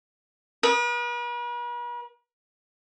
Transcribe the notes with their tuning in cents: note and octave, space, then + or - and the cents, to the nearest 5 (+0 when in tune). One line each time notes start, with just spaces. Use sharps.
B4 -45 D#6 -15